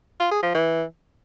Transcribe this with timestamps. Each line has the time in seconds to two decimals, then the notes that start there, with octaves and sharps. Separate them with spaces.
0.20 F4
0.31 G#4
0.43 F3
0.54 E3